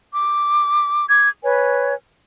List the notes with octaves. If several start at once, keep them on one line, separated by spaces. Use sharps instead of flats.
D6
D6 G#6
B4 C#5 G#5